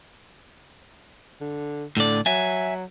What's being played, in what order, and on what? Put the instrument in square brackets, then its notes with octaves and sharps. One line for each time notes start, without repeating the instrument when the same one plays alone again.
[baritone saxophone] D3
[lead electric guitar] A2 D5 [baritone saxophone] D3
[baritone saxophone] F#3 [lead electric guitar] E5 G#5